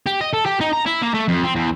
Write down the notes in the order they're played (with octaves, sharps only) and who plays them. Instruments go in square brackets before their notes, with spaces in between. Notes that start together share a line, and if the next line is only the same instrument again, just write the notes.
[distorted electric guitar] G4
D#5
A4
G4
D#4
A#5
E4
A#3
A3
F2
C4
E2